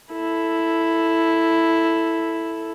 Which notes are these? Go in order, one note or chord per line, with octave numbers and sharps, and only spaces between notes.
E4 A4